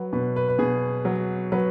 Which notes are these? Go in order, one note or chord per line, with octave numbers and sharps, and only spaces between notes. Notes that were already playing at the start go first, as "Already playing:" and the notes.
Already playing: F#3 B4
B2 B4
B4
B4
B2 G#4
F#3
F#3 B4